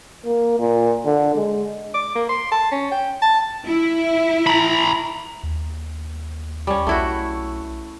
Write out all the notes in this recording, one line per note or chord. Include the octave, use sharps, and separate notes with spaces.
A#3
A#2
D3
G#3
D6
A#3
C6
A5
C#4
G5
A5
E4
A#5 B5
D#2
G3 C#4
B1 A3 E4 F#4